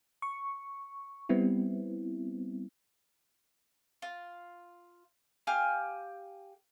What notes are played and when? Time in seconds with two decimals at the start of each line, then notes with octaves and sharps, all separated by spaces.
0.22 C#6
1.29 G3 B3 C4 E4
4.02 F4
5.47 G4 F5 G#5 F6